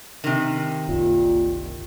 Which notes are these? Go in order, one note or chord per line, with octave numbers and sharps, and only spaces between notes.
C3 D#3
F#1 C2 A#2